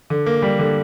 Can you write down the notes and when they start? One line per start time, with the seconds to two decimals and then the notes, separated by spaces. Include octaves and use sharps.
0.10 D3
0.26 A#3
0.42 G3
0.59 D3